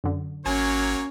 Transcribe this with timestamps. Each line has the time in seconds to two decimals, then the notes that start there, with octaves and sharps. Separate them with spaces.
0.04 F#2 D3
0.46 G#1 F#3 A#3 C#4 C#5 G#5